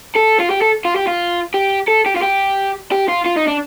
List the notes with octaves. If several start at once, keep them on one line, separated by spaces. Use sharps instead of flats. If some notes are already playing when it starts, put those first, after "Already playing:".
A4
F4
G4
A4
F4
G4
F4
G4
A4
G4
F4
G4
G4
F4
F4
D#4
D4